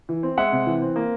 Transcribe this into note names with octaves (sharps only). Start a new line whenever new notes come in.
E3
C4
G#3 E5 F#5
C3
E3
C4
A#3